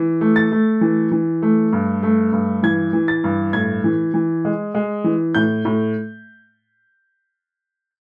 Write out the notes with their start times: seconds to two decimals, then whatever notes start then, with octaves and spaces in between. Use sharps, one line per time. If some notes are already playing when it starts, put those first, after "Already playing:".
Already playing: E3
0.21 A3
0.36 A6
0.52 A3
0.81 E3
1.12 E3
1.42 A3
1.73 G2
2.03 A3
2.33 G2
2.63 E3 G#6
2.93 E3
3.08 A6
3.24 G2
3.53 A2 G#6
3.84 E3
4.14 E3
4.45 G#3
4.75 G#3
5.04 E3
5.34 A2 G6
5.65 A2